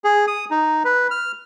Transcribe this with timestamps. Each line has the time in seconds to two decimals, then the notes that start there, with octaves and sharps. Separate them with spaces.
0.04 G#4
0.28 D#6
0.51 D#4
0.85 B4
1.11 F6